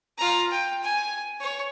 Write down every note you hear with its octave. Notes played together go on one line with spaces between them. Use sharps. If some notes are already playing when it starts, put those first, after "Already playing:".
F4 A#5
G5
G#5
C#5